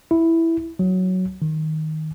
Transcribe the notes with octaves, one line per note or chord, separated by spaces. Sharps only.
E4
F#3
D#3